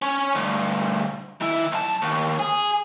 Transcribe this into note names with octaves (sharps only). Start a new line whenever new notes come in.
C#4 C#5
D2 G2
D#3 E4
B1 A5
D#2
G#4